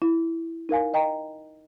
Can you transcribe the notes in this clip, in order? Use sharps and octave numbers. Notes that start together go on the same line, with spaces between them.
E4
D#4 A#4 F5 G#5
D#5 G5 A#5